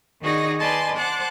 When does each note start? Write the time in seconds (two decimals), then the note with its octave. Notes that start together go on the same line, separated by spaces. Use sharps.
0.21 D#3 D#4 F#4 G#4 D5 A#6
0.59 B4 D5 D#5 G#5 A5 C6
0.96 C5 F#5 A5 D6 F#6